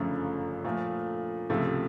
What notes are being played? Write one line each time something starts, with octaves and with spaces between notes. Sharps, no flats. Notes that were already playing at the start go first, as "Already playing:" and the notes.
Already playing: G1 F#2 C#3 F3 A3
A#2 F3 A3
C#2 C3 F3 A3